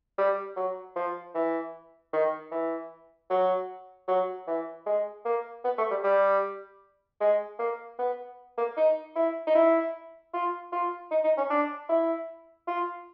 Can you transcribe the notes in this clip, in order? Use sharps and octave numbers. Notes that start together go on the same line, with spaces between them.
G3
F#3
F3
E3
D#3
E3
F#3
F#3
E3
G#3
A#3
B3
A3
G3
G3
G#3
A#3
B3
A#3
D#4
E4
D#4
E4
F4
F4
D#4
D#4
C#4
D4
E4
F4